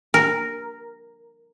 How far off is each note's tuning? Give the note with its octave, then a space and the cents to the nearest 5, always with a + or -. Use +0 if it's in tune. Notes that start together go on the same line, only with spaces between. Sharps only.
A#4 -5